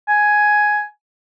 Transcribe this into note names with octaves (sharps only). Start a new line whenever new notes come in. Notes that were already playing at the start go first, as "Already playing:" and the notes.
G#5